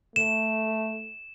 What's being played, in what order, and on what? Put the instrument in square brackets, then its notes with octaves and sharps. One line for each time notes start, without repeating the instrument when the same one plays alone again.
[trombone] A3 [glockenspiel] E7